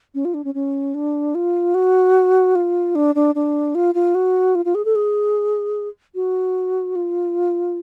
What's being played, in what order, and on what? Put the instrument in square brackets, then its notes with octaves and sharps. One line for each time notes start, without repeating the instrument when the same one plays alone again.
[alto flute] C#4
F4
D4
C#4
C#4
D4
F4
F#4
F4
D4
D4
D4
F4
F4
F#4
F4
F4
G#4
A4
G#4
F#4
F4